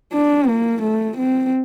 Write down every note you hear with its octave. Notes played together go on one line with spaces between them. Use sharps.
D4
A#3
A3
C4